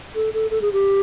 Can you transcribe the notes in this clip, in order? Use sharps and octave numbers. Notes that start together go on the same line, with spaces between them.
A4
A4
A4
G#4
G4